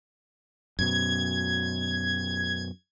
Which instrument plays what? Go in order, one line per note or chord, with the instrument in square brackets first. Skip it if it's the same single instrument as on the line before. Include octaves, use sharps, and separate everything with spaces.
[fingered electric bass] F#2 B2 [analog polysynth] G#6